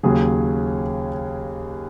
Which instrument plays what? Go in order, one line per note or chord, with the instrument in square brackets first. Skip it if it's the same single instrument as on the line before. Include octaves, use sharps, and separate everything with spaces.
[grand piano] D#2 C#3 F#3 G#4